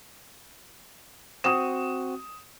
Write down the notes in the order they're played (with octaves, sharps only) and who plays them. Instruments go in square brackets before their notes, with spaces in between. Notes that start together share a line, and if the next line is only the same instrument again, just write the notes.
[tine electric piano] C4 F#4 [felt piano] D#6 E7